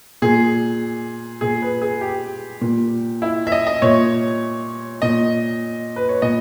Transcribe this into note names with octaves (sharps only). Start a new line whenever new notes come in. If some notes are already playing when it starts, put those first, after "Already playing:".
A#2 G#4
A#2 G#4
B4
G#4
G4
A#2
E4
E5
D#5
D#5
A#2 C#5
A#2 D#5
B4
C#5
A#2 D#5